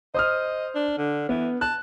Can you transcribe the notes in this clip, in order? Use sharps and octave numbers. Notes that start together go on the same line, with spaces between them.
C5 D#5 D#6 F6
D4
D3
E3 B3
A5 F#6